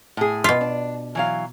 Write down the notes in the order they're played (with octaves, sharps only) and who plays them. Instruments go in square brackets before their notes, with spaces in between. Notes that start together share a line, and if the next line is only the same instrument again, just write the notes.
[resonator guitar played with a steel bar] A2 G#4
[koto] B2 F4
[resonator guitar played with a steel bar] D4
E3 F#3 F5